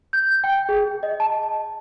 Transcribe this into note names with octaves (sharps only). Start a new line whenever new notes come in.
G6
G5
G#4
D#5
A5